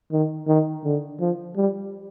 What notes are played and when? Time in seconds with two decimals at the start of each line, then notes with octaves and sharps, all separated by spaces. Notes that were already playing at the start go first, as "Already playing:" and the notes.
0.12 D#3
0.47 D#3
0.84 D3
1.20 F3
1.56 G3